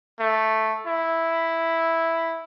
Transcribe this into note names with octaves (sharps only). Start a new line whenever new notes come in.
A3
E4